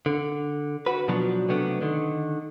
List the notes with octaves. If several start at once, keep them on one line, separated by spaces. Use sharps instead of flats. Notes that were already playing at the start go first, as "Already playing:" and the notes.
D3
F#4 B4
B2 F3 F#3 D4
C3 F#3 A3 B3 C4 D4
D3 D#3